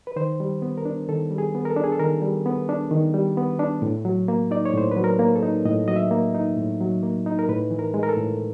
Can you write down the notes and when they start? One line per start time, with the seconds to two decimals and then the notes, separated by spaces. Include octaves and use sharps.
0.07 B4
0.16 D#3 C5
0.40 G3
0.62 B3
0.78 A#4
0.85 D4
1.08 D#3 A4
1.31 G3
1.38 G#4
1.55 B3
1.65 A#4
1.70 A4
1.77 D4
1.84 G#4
1.92 A4
2.00 D#3 A#4
2.22 G3
2.46 B3
2.69 D4
2.91 D#3
3.14 G3
3.37 B3
3.60 D4
3.82 A2
4.05 F#3
4.28 A#3
4.51 D#4 D5
4.65 C#5
4.74 A2 C5
4.91 F#3 B4
5.04 A#4
5.19 A#3
5.36 A4
5.43 D#4
5.65 A2 D#5
5.88 F#3 D#5
5.96 E5
6.11 A#3
6.35 D#4
6.57 A2
6.80 F#3
7.03 A#3
7.26 D#4
7.39 A#4
7.49 A2 B4
7.71 E3
7.79 A#4
7.94 G#3
8.03 A#4
8.09 A4
8.17 A2